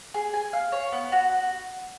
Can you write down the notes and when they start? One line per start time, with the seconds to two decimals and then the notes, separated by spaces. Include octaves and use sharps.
0.14 G#4
0.34 G#5
0.53 F5
0.72 C#5
0.92 B3
1.12 F#4